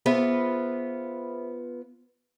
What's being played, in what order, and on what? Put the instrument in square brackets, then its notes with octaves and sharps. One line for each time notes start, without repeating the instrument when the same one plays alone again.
[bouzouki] B3 F4 B4 [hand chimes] G#4 C5 E5